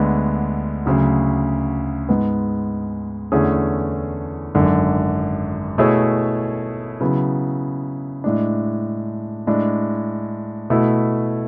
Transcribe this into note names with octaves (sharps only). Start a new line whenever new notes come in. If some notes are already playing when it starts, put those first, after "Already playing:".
Already playing: D2 D3 G#3 B3
D2 C#3 F#3
G#2 G#3 B3
E2 D3 A3 C#4 G#4
G#1 F#2 D3
B2 A3 E4 G#4 C#5
C#3 F#3 B3 E4
A2 G#3 D4
A2 G#3 D4
B2 A3 E4